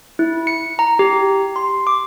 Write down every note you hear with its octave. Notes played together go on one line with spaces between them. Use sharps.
E4
C#7
A#5
G4
C6
D6